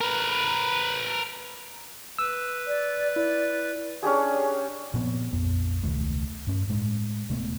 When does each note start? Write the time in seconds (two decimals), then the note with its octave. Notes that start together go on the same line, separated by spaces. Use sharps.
0.01 A#4 B4
2.19 B4 E6
2.67 D5
3.16 E4 D5
4.03 C#4 D4 G4 G#4
4.94 A#2 F3 B3 C4
5.33 A#1 F2 B3
5.83 E1 C#2 D#3 A3
6.47 G2 C#4
6.69 A2 G#3
7.30 D#1 C3 A3 B3